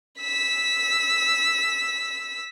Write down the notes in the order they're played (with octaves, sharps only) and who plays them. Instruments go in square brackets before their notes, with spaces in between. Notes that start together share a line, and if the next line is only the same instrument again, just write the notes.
[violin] E6 B6